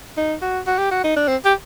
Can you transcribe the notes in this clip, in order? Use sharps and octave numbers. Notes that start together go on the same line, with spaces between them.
D#4
F#4
F#4
G4
F#4
D#4
D4
C4
G4